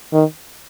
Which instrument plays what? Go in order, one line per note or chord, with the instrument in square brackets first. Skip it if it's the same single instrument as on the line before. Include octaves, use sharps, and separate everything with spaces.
[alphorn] D#3